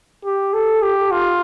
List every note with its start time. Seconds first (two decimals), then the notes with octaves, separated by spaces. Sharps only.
0.25 G4
0.54 A4
0.82 G4
1.12 F4